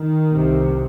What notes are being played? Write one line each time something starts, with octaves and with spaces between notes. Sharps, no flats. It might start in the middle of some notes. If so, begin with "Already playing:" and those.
Already playing: D#3
C2 C3